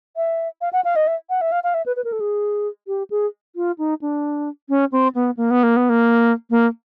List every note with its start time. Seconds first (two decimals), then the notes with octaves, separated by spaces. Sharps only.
0.16 E5
0.61 F5
0.73 F#5
0.84 F5
0.96 D#5
1.07 E5
1.30 F#5
1.41 E5
1.52 F5
1.63 F5
1.74 E5
1.86 B4
1.96 B4
2.04 A#4
2.12 A4
2.20 G#4
2.87 G4
3.10 G#4
3.56 F4
3.78 D#4
4.01 D4
4.69 C#4
4.92 C4
5.15 B3
5.37 A#3
5.51 B3
5.63 A#3
5.76 B3
5.89 A#3
6.50 A#3